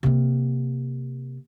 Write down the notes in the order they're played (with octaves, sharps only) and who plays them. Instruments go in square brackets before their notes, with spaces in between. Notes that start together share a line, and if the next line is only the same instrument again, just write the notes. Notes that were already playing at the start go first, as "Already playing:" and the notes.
[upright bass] C3 A#3